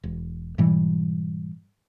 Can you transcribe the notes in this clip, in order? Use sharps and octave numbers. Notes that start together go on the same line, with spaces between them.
E1
G#2 B2 E3 G3